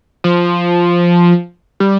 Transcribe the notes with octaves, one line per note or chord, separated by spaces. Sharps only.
F3
G3